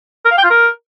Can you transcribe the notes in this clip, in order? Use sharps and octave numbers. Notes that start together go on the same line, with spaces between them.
A#4
F5
G5
F4
A#4